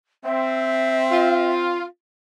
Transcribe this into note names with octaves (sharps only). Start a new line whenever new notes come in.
C4 E5
F4